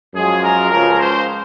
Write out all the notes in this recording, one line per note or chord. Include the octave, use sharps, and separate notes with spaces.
F#2 F3 G#3 G#4
A#4
C#2 C#3 F3 A#4
C5